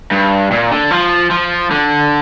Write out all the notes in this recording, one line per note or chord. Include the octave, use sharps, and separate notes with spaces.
G2
A#2
D3
F3
F3
D3